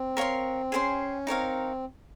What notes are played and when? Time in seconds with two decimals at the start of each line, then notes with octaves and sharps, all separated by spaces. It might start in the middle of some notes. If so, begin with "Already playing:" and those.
Already playing: C4
0.17 A#4 C#5 F5 C6
0.72 C#4 G#4 C5 G5 C6
1.27 C4 D#4 A#4 C#5 F5